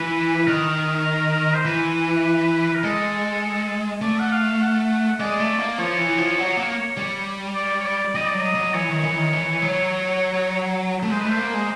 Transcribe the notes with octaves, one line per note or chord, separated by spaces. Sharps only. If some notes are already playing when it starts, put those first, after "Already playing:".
Already playing: E3 B4
B4
D#3 A#4
C5
E3 B4
A#4
G#3 A4
A3 D5
F#5
F5
F#5
G#3 D5
A3
A#3
F3 C#5
E3
F3
F#3
A#3
G3
D5
C#5
D5
G3 D#5
D5
F#3
D#5
F#3
E3 C#5
D#3
E3
D#3
E3
F#3
A3
G#3 C5
B4
A3 C5
A#3
G#3